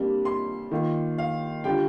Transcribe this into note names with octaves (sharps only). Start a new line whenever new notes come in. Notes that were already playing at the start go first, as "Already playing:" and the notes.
Already playing: C3 G3 A#3 D4
C6
D#3 A#3 F4
F5
D3 G3 D4 F4 G5